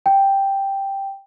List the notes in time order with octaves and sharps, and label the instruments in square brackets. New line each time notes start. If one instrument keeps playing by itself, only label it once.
[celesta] G5